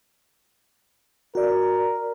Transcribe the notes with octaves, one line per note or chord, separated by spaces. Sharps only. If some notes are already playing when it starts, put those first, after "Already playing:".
F#4 A#4 D5